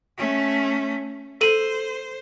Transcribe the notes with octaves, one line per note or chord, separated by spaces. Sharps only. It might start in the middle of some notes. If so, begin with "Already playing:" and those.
A3 C#4
A4 C5 D#7 F#7